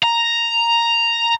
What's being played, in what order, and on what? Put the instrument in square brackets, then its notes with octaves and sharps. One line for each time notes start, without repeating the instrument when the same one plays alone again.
[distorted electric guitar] A#5